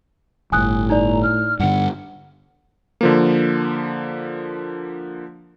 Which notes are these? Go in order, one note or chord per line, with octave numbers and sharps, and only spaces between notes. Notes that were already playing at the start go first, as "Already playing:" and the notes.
D1 G1 A2 G#5 D#6 F#6
D#4 D5 A#5
F6
G2 D3 F#5
D3 F3 A#3